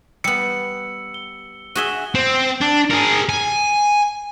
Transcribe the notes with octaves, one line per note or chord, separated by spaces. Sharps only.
G3 B3 E6 C#7
G7
F#4 G#4 E5 D#7 E7 G7
C4
D4
G#4 A#4
G#5